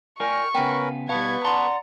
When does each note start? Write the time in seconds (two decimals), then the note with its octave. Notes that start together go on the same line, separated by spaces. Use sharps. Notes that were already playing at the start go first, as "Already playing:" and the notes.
0.20 A#4 D5 G5 G#5 C#6 F6
0.55 C#3 B3 C#4 A#4 B4 G5
1.09 B2 G3 B3 B4 F5 A5 C#6 G#6
1.45 D5 F#5 A5 A#5 C6